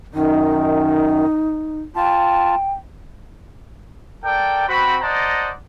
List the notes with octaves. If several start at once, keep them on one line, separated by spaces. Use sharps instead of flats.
F#2 D#3 D#4
F4 G5 A5
A4 A#4 D5 G5
C4 F#4 B5
C5 D5 D#5 F#5 A5 A#5